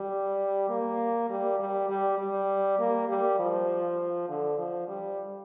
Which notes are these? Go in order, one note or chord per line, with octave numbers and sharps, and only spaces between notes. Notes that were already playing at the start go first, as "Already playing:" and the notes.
Already playing: G3
A#3
G3
G3
G3
G3
A#3
G3
F3
D3
F3
G3